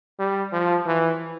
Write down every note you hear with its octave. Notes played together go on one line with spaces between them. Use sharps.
G3
F3
E3